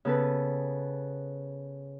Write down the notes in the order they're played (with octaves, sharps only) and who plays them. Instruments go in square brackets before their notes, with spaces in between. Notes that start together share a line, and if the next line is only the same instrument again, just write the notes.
[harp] C#3 B3 A4 B4